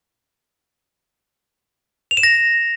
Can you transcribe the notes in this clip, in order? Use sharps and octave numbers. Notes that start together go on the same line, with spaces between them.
F7
E7
A#6